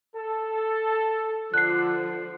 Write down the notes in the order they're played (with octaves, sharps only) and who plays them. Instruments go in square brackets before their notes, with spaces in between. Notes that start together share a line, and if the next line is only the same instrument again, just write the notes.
[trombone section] A4
[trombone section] D3 [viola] F3 [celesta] F#6 C7